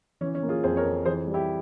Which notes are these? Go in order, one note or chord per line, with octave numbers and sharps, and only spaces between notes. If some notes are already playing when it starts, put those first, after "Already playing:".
E3 C#4
C#4
A#3
F4 G#4
F2 G#4 C5
A#4 C#5
F2
E3 G#4 C5
G3
E4 G4